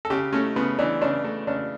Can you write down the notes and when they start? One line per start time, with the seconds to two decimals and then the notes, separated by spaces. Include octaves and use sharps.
0.05 A4
0.10 C#3 G4
0.33 A3 C#4
0.56 C#3 B3
0.79 E3 D4
1.01 C#3 D4
1.24 A3
1.47 C#3 D4